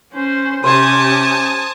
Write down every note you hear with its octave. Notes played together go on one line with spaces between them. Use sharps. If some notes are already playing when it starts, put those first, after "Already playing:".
C#4 C5
C3 C#4 G4 C5 G#5 A5 D#6